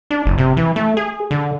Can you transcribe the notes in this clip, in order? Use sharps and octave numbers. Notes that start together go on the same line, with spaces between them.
D4
F#1
C3
E3
A3
G#4
D3